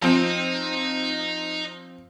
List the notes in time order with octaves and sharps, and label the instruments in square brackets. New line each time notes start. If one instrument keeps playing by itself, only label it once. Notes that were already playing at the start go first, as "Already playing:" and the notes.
[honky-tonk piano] F3 C4 [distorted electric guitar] D#4 D#5